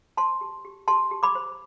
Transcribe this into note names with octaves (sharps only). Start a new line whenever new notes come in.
C5 A5 C6
G4
G4
G4 A5 C6
G4
B5 D6
C5